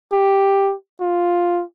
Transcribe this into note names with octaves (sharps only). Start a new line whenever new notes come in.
G4
F4